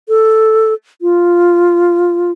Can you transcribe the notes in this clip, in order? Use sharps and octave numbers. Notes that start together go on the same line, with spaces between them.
A4
F4